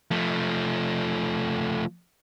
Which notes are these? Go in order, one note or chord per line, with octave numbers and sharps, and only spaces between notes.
F3 A3